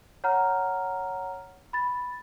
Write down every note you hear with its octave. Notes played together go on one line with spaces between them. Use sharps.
C#5 F#5 A#5 F6
B5 A6